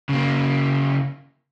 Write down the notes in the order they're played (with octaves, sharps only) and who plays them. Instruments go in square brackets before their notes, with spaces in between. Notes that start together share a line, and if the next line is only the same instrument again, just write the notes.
[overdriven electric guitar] C#3 A#3